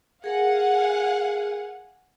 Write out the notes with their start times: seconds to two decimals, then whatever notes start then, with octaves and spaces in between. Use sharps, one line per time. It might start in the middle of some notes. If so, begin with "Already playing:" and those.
0.24 G#4 A#4 F5 F#5 G#5